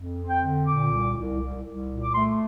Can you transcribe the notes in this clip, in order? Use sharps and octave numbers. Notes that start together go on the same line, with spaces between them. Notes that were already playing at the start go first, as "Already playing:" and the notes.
Already playing: F2
C4
G5
D3
A#2 D6
C2
C2
C2
C2
A#2
D6
A3 C6